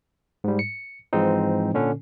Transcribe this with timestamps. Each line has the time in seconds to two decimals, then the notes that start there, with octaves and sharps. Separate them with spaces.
0.44 G#2 G3
0.59 C#7
1.13 G#2 E3 F3 G#3 C4 D#4
1.74 A#2 D3 C#4 D4